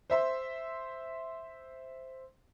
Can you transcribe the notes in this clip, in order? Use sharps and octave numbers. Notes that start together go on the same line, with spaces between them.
C5 E5 C6